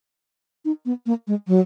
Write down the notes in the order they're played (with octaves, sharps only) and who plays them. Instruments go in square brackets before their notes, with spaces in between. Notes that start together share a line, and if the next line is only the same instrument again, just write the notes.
[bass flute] D#4
B3
A#3
G#3
F#3